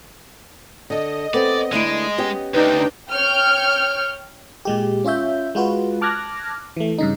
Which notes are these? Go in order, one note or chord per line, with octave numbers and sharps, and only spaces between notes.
D3 A4 D#5
B3 C4 A4 D5
D3 G#3 A3 E4 D7 D#7
B3 C#4 G4
D2 D4 D#4 B4 G5
C#5 G5 F6 G6
A#2 G#3 G4
C#4 F4 C#5 E5 G6
G#3 F4 F#4 B4
A5 D6 F6 F#6 G#6 A#6
E3 A3
G2 C#3 D#4